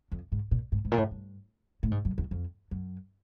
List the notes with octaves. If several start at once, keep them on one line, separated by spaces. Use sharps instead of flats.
F2
G#2
A#2
G#2
G#2
A#2
A2
G2
A2
G#2
F#2
E2
F2
F#2